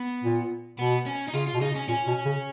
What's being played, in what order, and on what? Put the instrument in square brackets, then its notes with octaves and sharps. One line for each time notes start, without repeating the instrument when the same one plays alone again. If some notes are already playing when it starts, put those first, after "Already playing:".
Already playing: [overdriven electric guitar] B3
[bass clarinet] A#2
[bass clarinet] B2 [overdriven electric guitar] B3
[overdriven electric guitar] C#4
D#4
[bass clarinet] C#3 [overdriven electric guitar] F4
[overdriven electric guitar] F4
[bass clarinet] B2
[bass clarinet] C#3 [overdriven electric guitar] D#4
[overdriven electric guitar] C#4
[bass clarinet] A#2 [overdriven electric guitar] C#4
[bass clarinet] B2
C#3